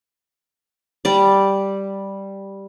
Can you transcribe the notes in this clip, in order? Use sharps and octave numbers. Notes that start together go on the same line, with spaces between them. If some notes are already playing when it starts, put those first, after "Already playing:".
G3 D5